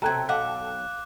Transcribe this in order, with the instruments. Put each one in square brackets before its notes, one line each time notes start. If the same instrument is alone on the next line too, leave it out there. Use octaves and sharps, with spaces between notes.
[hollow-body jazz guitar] B1 C3 [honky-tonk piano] A4 G5 [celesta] A#5 F#6 G#6
[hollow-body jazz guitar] B1 D#5 F#5 [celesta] F5 [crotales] D6 F#6